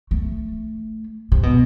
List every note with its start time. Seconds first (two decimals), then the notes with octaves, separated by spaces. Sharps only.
0.11 A3
1.32 C3
1.43 B2